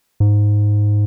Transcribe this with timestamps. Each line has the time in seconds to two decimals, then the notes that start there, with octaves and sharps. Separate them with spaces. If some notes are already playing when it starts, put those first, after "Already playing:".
0.20 G#2